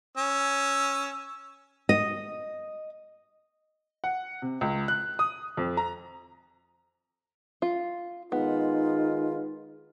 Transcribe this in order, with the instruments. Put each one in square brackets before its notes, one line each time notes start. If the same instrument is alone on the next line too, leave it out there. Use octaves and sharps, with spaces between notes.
[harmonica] C#4 E6
[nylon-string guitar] D#5
[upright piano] F#5
C3
C#2
F#6
D#6
F2
A#5
[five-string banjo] F4
[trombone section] D#3 G#3 F4 [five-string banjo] B3 [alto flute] D#4